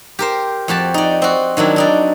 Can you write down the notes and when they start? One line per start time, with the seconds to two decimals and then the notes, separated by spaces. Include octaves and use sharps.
0.19 G4 A#4 C5
0.68 F2 F#4 G4 A5
0.94 D#4 D5
1.22 C4 F#4
1.57 D#3 F#3 D4 E4
1.76 D4 D#4 D5